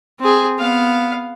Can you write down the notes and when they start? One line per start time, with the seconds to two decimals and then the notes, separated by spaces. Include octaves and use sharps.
0.20 C4 G#4
0.58 B3 F5